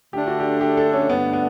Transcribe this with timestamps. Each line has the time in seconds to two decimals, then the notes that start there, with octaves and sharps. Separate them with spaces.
0.13 D3 A3 D4 G4
0.27 F#4
0.40 G4
0.61 G4
0.77 A4
0.93 C#4
1.09 G2 D3 A3 B3 D4
1.33 B3